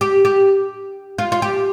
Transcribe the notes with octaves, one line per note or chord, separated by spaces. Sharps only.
G4
G4
F4
F4
G4